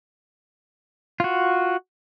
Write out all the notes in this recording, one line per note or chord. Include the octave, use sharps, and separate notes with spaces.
F4 F#4